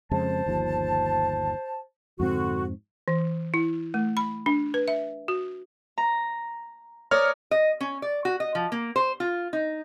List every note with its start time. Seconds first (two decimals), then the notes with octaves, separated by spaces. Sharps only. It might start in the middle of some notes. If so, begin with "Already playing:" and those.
0.11 F2 C#3 G#3 C5 A5
0.46 G1 D#2 F3
2.20 F2 G#2 D3 C4 F#4
3.08 E3
3.54 E4
3.94 A3
4.17 B5
4.46 D4
4.74 B4
4.88 E5
5.28 F#4
5.98 A#5
7.11 A#4 C#5 D5 D#6 F6
7.51 D#5
7.81 C#4
8.02 D5
8.25 F#4
8.40 D#5
8.55 F3
8.72 A#3
8.96 C5
9.20 F4
9.53 D#4